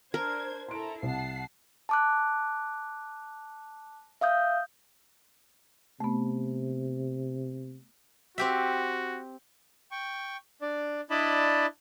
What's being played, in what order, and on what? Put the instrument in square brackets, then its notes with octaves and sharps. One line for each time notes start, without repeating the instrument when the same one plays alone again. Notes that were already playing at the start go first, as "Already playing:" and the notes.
[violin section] D4 C5 G#6 [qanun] A#4
[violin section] E4 A4 A#5 [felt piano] C6 D7
[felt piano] C2 [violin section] F#5 A5 C7
[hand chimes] A5 D6 F#6
E5 F5 D#6 G6
[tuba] C3 [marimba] A3 B3
[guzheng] C4 G4 E5 [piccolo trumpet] F#4
[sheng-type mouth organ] G5 C#6
D4 D5
D4 E4 D5 D#5 A5 B5